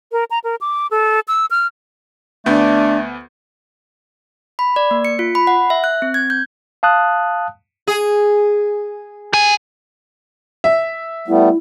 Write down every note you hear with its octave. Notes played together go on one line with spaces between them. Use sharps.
A#4
A#5
A#4
D6
A4
E6
F6
D2 A3 B3 D4 G6
B5
D5
A#3
C#7
F4
B5
F#5
E5
F#6
C4
G#6
G6
F5 A5 D#6 F#6
G#4
G4 G#5
E5
G3 A3 B3 E4